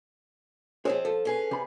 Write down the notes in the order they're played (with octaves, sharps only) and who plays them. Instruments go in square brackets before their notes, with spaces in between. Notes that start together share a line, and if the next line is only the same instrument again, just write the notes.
[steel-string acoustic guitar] F3 G#3 C4 [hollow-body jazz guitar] G#4 C#5
[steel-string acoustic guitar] F3 [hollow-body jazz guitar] A4
[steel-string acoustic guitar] C#4 G#4 B4
[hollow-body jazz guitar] C3 B5